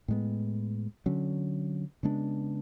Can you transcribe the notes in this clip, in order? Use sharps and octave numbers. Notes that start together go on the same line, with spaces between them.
A2 G#3 B3
D3 F#3 C#4
C#3 G#3 B3 D4